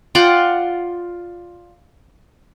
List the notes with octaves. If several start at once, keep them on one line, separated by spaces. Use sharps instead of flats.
F4 D5 F#5 G5